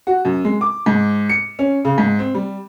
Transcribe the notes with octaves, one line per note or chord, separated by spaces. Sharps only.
F#4
F#2
G#3
D6
G#2
C#7
C#4
C#3
G#2
C4
G3